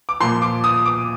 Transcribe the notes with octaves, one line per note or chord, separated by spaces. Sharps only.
D6
A#2 F3 C6
D6
D#6
D6